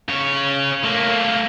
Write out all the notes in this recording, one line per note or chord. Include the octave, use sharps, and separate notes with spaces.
C#3 C#5
A3 A#3